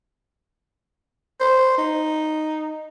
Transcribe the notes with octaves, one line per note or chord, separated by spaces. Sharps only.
C5
D#4